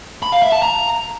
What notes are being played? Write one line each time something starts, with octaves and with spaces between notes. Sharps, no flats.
B5
F5
E5
A5
A#5